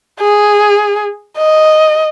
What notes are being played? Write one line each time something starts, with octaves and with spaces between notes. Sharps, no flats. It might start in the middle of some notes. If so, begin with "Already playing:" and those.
G#4
D#5